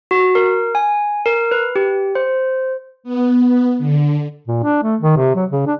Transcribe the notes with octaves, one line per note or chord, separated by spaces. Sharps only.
F#4
A#4
G#5
A#4
B4
G4
C5
B3
B3
D3
A#2
D4
A3
D#3
C3
F#3
C#3
D4